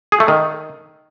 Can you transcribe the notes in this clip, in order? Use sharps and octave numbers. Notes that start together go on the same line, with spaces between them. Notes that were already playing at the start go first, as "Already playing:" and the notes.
G#4
A3
D#3